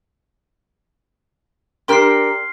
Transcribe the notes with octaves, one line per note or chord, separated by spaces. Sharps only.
D4 G4 A#4 C6 F6 C7